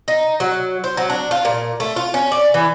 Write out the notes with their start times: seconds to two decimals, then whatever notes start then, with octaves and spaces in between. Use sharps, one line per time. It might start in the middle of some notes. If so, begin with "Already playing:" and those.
0.08 D#4
0.40 F#3
0.84 C5
0.97 F#3
1.10 D4
1.31 F4
1.45 A#2
1.80 A3
1.96 F4
2.14 C#4
2.32 D5
2.54 E3